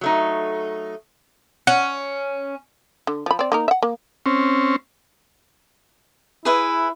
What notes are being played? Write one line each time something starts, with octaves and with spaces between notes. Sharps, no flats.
F#3 A3 D#4
C#4 F#5
D3
F3 B5
C4 D5
A#3 D#4 A#4
E5 F#5
A#3
C4 C#4
E4 G#4 B4 E5